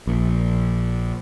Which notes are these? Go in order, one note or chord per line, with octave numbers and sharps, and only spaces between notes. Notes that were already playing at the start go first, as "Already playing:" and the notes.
A#1